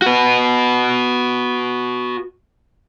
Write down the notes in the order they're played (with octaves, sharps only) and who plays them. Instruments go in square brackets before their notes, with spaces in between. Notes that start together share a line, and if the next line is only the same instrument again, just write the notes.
[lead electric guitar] F#4 B4